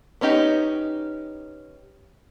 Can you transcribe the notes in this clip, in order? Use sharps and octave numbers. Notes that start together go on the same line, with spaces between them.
B3 C#4 D#4 G4